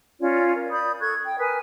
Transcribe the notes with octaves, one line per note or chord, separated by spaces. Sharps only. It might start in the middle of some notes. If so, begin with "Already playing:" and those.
C#4 F4 C#5 D5
A#4
D5 B5 D#6 G6
A4 C#6 F#6 G#6
G5
A#4 B4 G#5 D#6